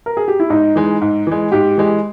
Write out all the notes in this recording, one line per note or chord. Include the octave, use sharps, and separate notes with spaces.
A#4
G#4
G4
E4
G#2 D#4
E3 G#3
G#2
E3 G#3
G#2 G4
E3 G#3